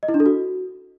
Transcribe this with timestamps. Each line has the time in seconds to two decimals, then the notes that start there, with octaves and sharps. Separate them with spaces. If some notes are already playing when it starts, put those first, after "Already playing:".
0.03 D#5
0.08 E4
0.14 D4
0.20 A4
0.26 F#4